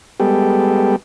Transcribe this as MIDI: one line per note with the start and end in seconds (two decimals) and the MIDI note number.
0.20 0.96 55
0.20 0.96 56
0.20 0.96 59
0.20 0.96 67
0.20 0.96 69